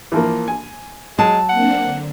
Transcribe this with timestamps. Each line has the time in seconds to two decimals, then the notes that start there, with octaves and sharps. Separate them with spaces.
0.12 E3 F3 A#3
0.48 G#5
1.19 F#3 G#3 A5
1.49 A#3 C4 D4 F#5
1.80 D3